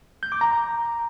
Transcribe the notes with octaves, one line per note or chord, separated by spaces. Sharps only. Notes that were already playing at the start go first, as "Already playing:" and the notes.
G6
D6
A#5